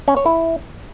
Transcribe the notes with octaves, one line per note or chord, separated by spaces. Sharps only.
C#4
C#5
E4